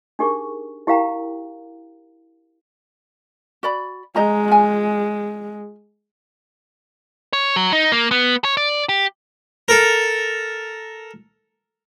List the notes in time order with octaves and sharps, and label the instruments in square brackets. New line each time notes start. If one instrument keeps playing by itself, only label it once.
[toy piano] D4 D#4 G4 G#4 A#4 C#6
E4 G4 A#4 F5 G5 A#5
[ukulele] F#4 D5 B5
[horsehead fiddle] G#3 [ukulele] D#5 A#5
[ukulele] F4 G#5
[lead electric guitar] C#5
F#3
D#4
A#3
B3
C#5
D5
G4
[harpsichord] A4 A#4